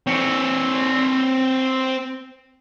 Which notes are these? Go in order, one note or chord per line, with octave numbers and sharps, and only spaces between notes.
C4 C#5